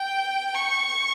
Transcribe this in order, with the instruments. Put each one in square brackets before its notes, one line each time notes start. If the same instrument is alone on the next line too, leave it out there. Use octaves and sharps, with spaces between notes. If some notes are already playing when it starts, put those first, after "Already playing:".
Already playing: [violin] G5
C#6